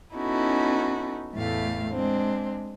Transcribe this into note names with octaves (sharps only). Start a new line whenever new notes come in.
B3 C#4 D#4 E4 F#4 A4
E2 A2 A3 F5
G#3 C4 D4